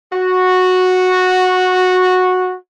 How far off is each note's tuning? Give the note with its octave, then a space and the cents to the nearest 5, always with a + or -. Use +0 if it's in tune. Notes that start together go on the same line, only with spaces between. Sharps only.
F#4 -10